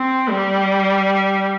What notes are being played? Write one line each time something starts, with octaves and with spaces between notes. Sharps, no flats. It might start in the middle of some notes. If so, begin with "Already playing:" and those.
Already playing: C4
G3